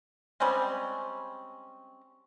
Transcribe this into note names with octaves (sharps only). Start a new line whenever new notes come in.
G3 G#3 C4 C#4